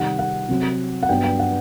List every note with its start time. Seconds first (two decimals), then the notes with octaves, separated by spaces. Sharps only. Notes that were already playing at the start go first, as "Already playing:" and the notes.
Already playing: C3 D#3 G3 C4 F#5
0.19 F#5
0.49 C3 F#3 C4
1.03 F#5
1.09 G2 F#3 B3 G5
1.24 G5
1.39 F#5